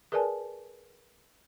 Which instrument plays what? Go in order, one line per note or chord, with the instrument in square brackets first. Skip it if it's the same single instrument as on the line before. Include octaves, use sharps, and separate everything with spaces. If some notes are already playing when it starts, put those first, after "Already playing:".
[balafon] G#4 A#4 B4 D5 G#5 A5